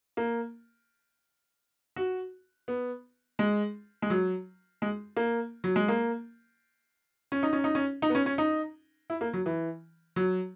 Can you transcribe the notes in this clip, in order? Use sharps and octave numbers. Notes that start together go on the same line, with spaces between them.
A#3
F#4
B3
G#3
G#3
F#3
G#3
A#3
F#3
G#3
A#3
C#4
D#4
C#4
D#4
C#4
D#4
B3
C#4
C#4
D#4
E4
A#3
F#3
E3
F#3